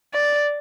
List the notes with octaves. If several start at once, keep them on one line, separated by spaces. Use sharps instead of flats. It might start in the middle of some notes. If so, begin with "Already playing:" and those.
D5